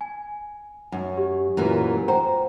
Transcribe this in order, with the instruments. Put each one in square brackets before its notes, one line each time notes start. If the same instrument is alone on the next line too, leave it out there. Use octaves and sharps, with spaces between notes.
[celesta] G#5
[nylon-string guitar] F#2
[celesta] G4
[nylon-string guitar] F#2 A#2 E3
[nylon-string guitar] C5 [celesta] F#5 G5 A#5